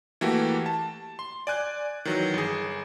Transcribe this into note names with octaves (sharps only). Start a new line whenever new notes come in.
E3 A3 A#3 F#4 G4
A5
C6
D5 G#5 F#6 G6
D#3 E3 F#3
G1 G#4